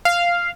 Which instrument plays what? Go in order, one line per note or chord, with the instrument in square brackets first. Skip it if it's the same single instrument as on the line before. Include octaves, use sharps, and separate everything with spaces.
[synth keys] F5